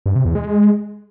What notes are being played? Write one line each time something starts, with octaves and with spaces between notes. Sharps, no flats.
G2
C3
E2
G#3